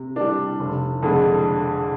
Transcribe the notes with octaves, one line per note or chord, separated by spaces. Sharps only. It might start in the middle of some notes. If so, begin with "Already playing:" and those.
Already playing: C3
G3 D4
F1
F2 D3 G#3